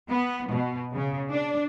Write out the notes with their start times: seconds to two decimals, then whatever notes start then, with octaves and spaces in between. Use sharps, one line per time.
0.11 B3
0.51 B2
0.93 C#3
1.31 D4